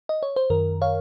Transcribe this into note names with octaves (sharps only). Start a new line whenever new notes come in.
D#5
C#5
C5
F#2 D#3 A#4
C#5 F5